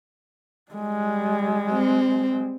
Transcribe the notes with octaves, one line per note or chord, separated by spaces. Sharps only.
G3 G#3
C4